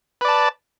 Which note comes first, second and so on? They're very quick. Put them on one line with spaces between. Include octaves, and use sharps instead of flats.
B4 D5 A5